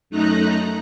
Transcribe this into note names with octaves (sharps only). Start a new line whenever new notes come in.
F#2 A3 D#4 A#5 F#6